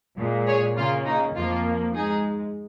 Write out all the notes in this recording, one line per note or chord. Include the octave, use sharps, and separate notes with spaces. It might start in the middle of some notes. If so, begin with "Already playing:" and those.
A#2 G#3
G#4 C#5
C#3 A#3 F4
D#4
F2 F3 A#3 F4
G#2 G#3 D#4 G#4